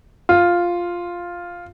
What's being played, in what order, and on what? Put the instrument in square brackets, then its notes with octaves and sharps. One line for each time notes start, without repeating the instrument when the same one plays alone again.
[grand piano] F4